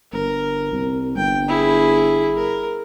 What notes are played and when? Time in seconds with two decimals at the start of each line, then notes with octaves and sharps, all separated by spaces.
0.12 G1 A#4
0.72 C2
1.16 G1 G5
1.49 E4 G#4
2.36 A#4